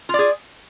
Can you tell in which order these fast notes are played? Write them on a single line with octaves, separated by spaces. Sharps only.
F4 D5 G#4